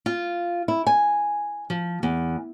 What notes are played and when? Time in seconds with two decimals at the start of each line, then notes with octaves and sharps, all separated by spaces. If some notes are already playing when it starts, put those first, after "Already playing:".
0.06 F4
0.68 E4
0.87 G#5
1.70 F3
2.03 E2